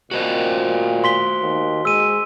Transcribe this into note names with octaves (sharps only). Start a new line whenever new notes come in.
A#2 F#4 C5 D#5
C6 B6 G7
D#2
G#3 E6 D#7